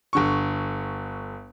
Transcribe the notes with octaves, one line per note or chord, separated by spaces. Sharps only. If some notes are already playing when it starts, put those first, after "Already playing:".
G1 D3 C#6